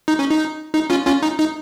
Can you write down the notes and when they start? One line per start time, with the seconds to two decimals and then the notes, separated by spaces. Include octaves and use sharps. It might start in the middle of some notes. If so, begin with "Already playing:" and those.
0.08 D#4
0.19 C#4
0.30 D#4
0.74 D#4
0.90 C#4 F4
1.06 C#4 F4
1.22 D#4
1.39 D#4